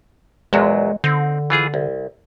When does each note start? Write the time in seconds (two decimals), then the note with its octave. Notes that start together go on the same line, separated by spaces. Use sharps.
0.53 A#1 E2 F#3 G#3
1.04 D3 C4 D#4
1.50 E3 F4 G#4
1.74 C2